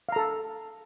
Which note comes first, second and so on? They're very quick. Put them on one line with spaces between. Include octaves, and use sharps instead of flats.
F5 A#5 A4